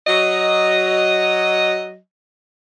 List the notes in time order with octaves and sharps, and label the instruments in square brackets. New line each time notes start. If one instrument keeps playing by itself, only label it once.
[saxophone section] F#3 D#5